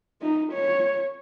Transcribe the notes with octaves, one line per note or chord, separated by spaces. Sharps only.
D#4
C#5